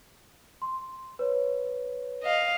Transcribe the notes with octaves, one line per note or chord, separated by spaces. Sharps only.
C6
B4 C#5
D#5 F5